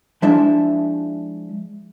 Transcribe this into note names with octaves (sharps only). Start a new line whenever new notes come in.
F3 G#3 D4 E4 E5